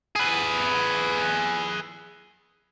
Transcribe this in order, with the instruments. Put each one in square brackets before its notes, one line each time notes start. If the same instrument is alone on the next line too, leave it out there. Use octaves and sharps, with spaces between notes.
[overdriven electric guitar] G#4 B4